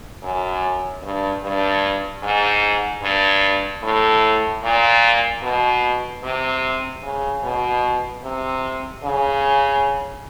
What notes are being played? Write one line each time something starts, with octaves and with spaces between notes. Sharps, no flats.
F#2
G2
G2
G#2
G2
A2
A#2
B2
C3
C#3
B2
C3
C#3